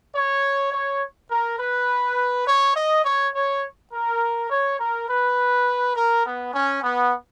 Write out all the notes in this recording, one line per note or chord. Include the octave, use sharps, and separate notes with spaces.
C#5
C#5
A#4
B4
C#5
D#5
C#5
C#5
A#4
C#5
A#4
B4
A#4
B3
C#4
B3